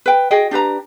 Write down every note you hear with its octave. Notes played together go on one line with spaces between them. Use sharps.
B4 G5
F#4 G#4 D#5 G5
D4 G4 B4 A#5